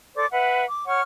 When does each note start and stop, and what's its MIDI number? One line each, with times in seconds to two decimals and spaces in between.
0.14 0.25 69
0.14 0.25 72
0.14 0.25 74
0.14 0.25 86
0.31 0.64 71
0.31 0.64 76
0.31 0.64 78
0.67 0.87 86
0.87 1.02 73
0.87 1.02 78
0.87 1.02 85
0.87 1.02 89